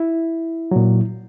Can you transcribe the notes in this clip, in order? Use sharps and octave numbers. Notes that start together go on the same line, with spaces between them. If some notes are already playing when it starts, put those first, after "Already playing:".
Already playing: E4
A#2 F#3